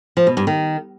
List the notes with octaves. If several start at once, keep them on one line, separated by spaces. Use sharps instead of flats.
F3
B2
G2
D#3